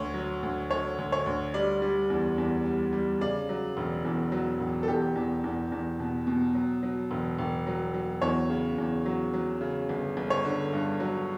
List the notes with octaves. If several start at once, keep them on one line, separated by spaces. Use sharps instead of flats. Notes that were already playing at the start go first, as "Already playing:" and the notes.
Already playing: D2 C#5
F#3
D2
D3 C#5
D2
C#5
D2
G3 D5
G3
E2
E2
G3
G3
C#3 D5
F#3
E1
E2
F#3
E1
A4
E2 G4
E2
E2
E2
B2
B2
F#3
F#3
E1
E1
F#3
F#3
E2 C#5
C#3
E2
F#3
F#3
C#3
G1
G1
C#5
D3
G2
F#3